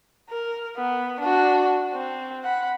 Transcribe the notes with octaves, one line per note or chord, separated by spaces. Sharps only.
A#4
B3
D4 F#4
C4
F#5 B5